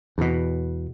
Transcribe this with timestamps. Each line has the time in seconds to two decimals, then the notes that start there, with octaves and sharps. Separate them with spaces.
0.18 E2 B2